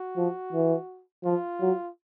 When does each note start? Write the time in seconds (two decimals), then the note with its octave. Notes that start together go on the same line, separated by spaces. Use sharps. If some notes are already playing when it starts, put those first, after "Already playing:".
Already playing: F#4
0.17 F3
0.52 E3
1.24 F3 F4
1.61 F#3